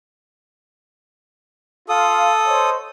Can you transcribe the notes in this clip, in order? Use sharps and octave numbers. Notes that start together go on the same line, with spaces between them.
F4 A4 F5 D#6
C5 C#5 D#5